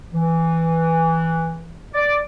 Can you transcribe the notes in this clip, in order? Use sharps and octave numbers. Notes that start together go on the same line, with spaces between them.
E3
D5